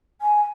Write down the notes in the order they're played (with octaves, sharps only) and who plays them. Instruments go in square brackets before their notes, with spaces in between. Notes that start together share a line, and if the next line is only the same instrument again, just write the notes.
[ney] G#5